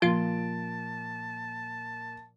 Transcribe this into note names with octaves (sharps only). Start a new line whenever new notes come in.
A#2 F3 F4 A5 D7